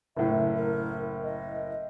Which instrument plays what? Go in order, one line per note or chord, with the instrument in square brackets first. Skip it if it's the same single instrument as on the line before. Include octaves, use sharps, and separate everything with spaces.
[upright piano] F#1 A2 [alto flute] E5
[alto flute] A#4
D#5